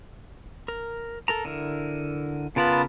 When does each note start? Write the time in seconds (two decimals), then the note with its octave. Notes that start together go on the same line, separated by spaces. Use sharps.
0.68 A#4
1.28 A4 A#4 A#5
1.45 D3 E4 A#4
2.56 C#3 B3 F4 A#4 A5 B5